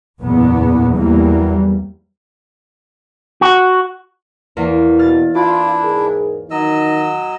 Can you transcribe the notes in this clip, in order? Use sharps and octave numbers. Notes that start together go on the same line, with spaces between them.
F#1 E2 A#2 B3
E2 E3 F#3 G3 A#3
F#4
E2 E3 A#3
B2 F6 A6
D4 E4 F4 D6
G#2 G#4 A#4
D#3 F#3 D#4 D#5 E6